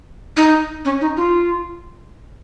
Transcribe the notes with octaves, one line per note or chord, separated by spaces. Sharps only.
D#4
C#4
D#4
F4